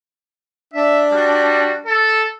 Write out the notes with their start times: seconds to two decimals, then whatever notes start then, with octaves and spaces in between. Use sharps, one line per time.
0.73 D4 E5
1.12 G3 F#4
1.84 A4